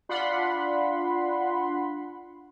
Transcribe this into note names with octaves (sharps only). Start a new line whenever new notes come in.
D4 F4 F#5 B5 C6